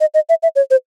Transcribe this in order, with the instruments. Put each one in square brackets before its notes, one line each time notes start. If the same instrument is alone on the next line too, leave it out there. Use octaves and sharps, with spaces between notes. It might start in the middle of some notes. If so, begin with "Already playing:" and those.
[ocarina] D#5
D#5
E5
E5
C#5
C5